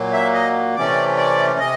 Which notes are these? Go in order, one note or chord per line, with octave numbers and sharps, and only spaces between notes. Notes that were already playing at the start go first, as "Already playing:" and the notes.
Already playing: A#2 F#3 A#3
E5
D#5
C3 E3 A3 C#4 D5
D5
C3 D#5